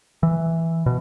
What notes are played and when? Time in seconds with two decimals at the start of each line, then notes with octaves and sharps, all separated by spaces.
0.23 E3
0.86 B2